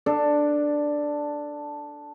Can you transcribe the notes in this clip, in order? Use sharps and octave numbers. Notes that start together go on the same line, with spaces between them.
D4 A4